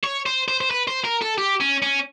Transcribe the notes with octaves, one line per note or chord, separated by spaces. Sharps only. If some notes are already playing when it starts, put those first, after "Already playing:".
C#5
C5
C5
C5
B4
C5
A#4
A4
G4
C#4
C#4